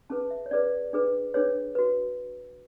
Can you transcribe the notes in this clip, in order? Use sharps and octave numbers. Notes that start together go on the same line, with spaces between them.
C#4 G#4 B4 A5
E5
C#5
C#4 G#4 B4 D5
D4 G#4 B4
D4 G#4 B4 C#5
F#4 B4